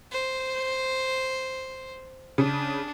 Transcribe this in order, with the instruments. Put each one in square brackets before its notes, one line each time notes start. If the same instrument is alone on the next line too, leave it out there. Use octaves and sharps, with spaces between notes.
[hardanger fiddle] C5
[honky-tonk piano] C#3 [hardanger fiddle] D4